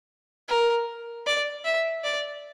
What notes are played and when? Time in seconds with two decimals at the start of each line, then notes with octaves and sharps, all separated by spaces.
0.48 A#4
1.26 D5
1.65 E5
2.04 D5